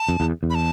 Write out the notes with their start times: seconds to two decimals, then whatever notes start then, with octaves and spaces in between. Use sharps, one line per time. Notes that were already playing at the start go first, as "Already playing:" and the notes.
Already playing: A5
0.09 F2
0.20 E2
0.43 E2
0.50 B5
0.55 A5